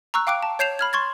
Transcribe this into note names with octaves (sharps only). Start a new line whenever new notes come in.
A#5 C#6 E6 F#6
F5 G5 D6 F#6 D7
A5
C#5 G6 C7 E7 F7
B5 F6 G#6
C6 C#6 G#6 A6